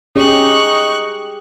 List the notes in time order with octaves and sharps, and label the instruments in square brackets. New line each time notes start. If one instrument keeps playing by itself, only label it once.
[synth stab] C#4 [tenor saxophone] D#4 [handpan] G4 G#4 [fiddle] C#6 F#6